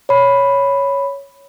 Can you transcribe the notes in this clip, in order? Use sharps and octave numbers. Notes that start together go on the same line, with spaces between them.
C#5 B5